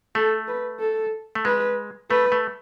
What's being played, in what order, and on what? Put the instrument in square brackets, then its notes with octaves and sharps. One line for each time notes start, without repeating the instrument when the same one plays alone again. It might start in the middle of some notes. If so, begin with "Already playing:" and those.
[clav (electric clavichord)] A3 [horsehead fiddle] A4
[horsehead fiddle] B4
A4
[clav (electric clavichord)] A3
[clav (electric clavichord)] G#3 [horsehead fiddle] B4
[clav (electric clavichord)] A3 [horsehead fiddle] B4
[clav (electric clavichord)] A3